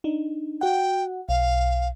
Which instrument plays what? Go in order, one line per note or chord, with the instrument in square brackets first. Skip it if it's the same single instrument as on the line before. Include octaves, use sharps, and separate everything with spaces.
[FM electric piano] D4 D#4
[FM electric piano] F#4 F#5 [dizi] G5
[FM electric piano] B1 [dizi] F5